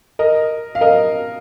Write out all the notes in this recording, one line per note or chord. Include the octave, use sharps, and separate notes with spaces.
A#4 D#5
F5
A#4 D#5